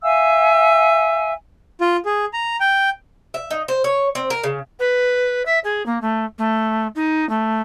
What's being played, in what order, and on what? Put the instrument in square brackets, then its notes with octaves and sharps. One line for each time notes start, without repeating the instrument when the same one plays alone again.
[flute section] E5 F5 G#5 E6
[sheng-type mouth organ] F4
G#4
A#5
G5
[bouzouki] E5
D#4
C5
C#5
C4
A#4
C#3
[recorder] B4
E5
G#4
A#3
A3
A3
D#4
A3